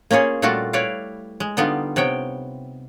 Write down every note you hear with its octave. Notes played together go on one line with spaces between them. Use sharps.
A#3 C#4 F4 G#4 C#5
A#2 G3 A3 F4 F#4 A5
E4 B4 C#5 D5 F5
G#3
D3 G3 B3 D#4 F4
C3 B3 C#5 G5